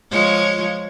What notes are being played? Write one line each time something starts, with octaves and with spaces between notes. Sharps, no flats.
F3 G#3 C#5